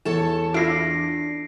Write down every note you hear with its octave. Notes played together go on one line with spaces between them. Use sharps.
E2 A4 C#5 A5
D4 E4 F4 A#6 C7 D7